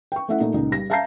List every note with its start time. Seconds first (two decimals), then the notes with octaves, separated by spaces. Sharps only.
0.12 G5 C#6
0.29 A3 C#4 E4 E5 F#5
0.40 A#2 A3 D#4
0.54 C#2 A#2 D#4
0.72 G3 A#6
0.90 E5 F5 A5 A#5 G6 C7